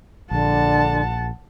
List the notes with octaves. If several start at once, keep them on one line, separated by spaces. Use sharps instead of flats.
A#1 D3 F#5 A5